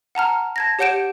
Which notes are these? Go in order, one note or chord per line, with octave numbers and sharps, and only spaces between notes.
F#5 A5 A#5 F6
A5 G#6 A#6
G4 C#5 F#5 G6 D7 E7